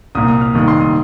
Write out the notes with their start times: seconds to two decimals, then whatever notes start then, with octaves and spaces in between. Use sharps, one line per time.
0.15 C2 A#2 A#3 D#6
0.28 D#6
0.41 F6
0.54 F1 D#2 D#3 G3 D#6
0.68 C6
0.81 D#6